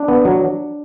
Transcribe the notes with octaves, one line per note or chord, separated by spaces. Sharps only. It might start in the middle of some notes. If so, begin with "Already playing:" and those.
Already playing: D4
B3
F#3